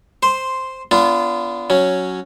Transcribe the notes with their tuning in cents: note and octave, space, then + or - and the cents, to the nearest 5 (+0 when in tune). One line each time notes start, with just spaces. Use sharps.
C5 +0 C6 -5
B3 +0 D4 -25 F4 -25
F#3 +0 C#4 +0